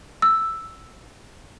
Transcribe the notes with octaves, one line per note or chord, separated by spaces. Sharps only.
E6